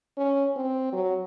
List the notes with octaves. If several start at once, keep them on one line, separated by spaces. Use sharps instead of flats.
C#4
C4
F#3